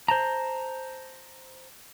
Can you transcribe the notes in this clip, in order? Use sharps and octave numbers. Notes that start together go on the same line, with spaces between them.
C5 A5 A#5